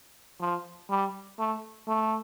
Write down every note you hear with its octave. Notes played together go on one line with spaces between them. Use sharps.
F3
G3
A3
A3